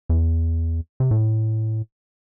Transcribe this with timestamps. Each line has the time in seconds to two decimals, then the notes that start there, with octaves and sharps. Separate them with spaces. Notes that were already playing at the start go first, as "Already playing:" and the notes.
0.09 E2
1.00 C3
1.11 A2